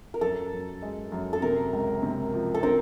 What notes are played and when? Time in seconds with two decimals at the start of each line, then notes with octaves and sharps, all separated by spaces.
0.14 A#4
0.21 F#2 A4
0.52 F#2
0.82 G#3
1.12 F#2
1.33 A4
1.42 C3 A#4
1.73 C#2
2.03 C3
2.34 F3
2.54 A4
2.63 C4 A#4